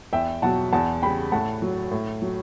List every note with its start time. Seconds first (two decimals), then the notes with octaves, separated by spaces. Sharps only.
0.13 E2 E5 G5
0.42 B2 F#3 F#5 A5
0.72 E2 F#5 A5
1.02 C#3 G3 G5 B5
1.32 A2 F#5 A5
1.62 F#3
1.91 A2
2.22 F#3